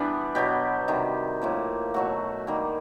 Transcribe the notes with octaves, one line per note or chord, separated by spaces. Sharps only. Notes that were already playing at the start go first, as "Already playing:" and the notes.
Already playing: E3 G3 B3 D4
B2 F#3 B3 G4
C3 D#3 G3
A2 F3 A#3
B2 F#3 A3 F#4
D#3 G3 A#3